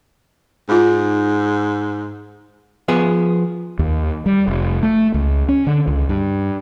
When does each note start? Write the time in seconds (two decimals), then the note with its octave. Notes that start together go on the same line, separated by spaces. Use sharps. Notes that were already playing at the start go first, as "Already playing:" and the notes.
0.69 G#2 D#4 F4
2.88 F3 B3 G#4
3.79 D#2
4.26 G3
4.48 F1
4.83 A3
5.14 C#2
5.49 C#4
5.67 D3
5.87 C#2
6.09 G2